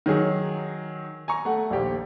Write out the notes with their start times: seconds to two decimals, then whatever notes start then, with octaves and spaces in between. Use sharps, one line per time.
0.06 D#3 F#3 G#4
1.28 G#5 A#5 C#6
1.45 A3 F#5
1.70 A#1 D#2 G4